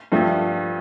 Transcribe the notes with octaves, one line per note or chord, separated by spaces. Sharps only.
G2 F3 A3